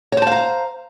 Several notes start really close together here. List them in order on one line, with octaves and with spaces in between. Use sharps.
C#5 C5 A5 F5 A#5